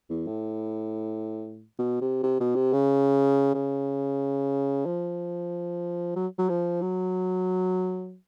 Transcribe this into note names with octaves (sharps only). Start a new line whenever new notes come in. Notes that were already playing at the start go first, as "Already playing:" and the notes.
E2
A2
B2
C3
C3
B2
C3
C#3
C#3
F3
F#3
F#3
F3
F#3